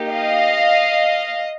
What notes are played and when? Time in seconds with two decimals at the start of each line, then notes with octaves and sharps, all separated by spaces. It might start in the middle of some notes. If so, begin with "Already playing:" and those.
Already playing: A#3 D#4 G4
0.10 D#5 F5